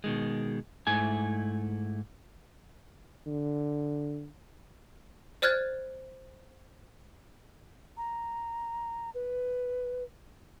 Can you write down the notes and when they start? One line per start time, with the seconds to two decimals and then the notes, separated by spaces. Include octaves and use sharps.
0.04 B2 D#3 G#3
0.87 G#2 A3 E4 G#5
3.26 D3
5.42 C5 D5 F6 F#6 G#6 A6
7.97 A#5
9.15 B4